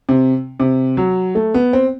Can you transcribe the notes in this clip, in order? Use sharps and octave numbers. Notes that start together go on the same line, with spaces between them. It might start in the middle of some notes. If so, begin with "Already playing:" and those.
C3
C3
F#3
A3
B3
C4